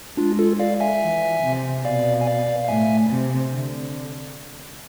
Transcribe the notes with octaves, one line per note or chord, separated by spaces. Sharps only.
G#3 D4 F4
F4 A4
D5 F5
E5 G#5
E3
C3
B2 D5 F5
G#5
D5 F5
F5
A2 E5 G#5
C3
D3